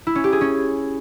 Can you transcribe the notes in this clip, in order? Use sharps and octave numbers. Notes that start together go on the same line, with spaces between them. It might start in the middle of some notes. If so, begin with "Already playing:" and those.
E4
C#4
G4
G#4
C#4